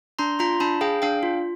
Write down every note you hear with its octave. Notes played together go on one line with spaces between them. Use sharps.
D4 A#5 C6
F4 A#5 C6
D4 A5 B5
G#4 F5 G5
D4 F5 G5
F4